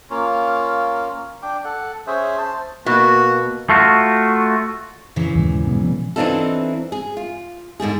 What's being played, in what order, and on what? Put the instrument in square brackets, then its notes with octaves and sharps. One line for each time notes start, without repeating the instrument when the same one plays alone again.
[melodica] A#3 C#4 F4
D4 G5 D6
A4 F#5
C#4 G#4 C5 E5
C5 A5
[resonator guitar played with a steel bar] B2 [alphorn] A#3 [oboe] F#4
[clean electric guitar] A3 F4 F#4
[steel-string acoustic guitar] A#2 C#3 E3
[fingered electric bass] D#2 G#2
B2 G#3
F3 B3
[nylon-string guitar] E3 C4 D4 D#4 F4 A4
G#4
F4
G#2 D3 G3 G#4